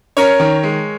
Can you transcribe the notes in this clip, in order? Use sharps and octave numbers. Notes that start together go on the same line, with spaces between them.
C#4 A#4 C#5
D#3
G#3